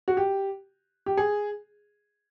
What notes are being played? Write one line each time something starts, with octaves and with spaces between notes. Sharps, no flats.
F#4
G4
G4
G#4